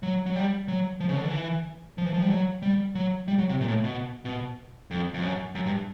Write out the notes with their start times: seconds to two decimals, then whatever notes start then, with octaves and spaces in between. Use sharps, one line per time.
0.03 F#3
0.26 F#3
0.36 G3
0.68 F#3
1.00 F3
1.09 C#3
1.17 D3
1.25 E3
1.98 F3
2.05 E3
2.14 F3
2.22 G3
2.30 F#3
2.62 G3
2.95 F#3
3.28 G3
3.38 F#3
3.49 C3
3.60 A#2
3.68 A2
3.84 B2
4.25 B2
4.91 F2
5.14 F2
5.22 F#2
5.55 F#2
5.66 G2